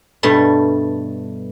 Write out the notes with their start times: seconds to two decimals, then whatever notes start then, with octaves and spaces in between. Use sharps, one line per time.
0.23 G2 B2 A3